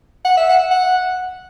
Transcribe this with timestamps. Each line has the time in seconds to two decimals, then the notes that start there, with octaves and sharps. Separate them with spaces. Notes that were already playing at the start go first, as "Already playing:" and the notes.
0.25 F#5
0.37 E5
0.49 F#5
0.71 F#5